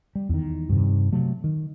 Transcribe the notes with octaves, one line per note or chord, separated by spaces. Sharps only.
G3
E2 D#3
G2 C3 D#3
C3 F#3 A3
D#3